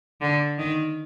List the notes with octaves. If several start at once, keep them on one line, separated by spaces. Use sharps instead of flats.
D3
D#3